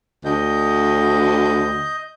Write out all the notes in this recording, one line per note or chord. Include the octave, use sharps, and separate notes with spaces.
D2 D#5 G6